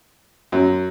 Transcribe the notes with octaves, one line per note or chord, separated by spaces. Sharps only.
F#2